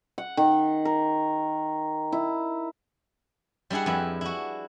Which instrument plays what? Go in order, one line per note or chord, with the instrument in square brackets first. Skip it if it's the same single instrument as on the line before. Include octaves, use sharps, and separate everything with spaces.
[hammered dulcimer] F#5
D#3
A#4
E4
[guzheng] G3 D4 E4 G#4 F#5
F2 E4 B4
E4 F#4